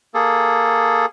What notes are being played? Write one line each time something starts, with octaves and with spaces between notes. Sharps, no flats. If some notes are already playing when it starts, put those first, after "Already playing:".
A#3 G#4 A4